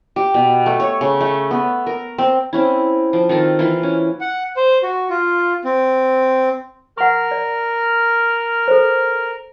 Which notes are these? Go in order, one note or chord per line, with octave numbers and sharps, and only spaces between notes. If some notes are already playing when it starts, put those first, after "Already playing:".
G4
B2
A3
C#5
C#3
A3
B3
A#4
C4
C4 C#4 E4
F3
D#3 C4 F4 A4
E3 A#3 F4 C6
C#4
F#5
C5
F#4
F4
C4
A#4 F#5 C#6 F6
D5
A4 C5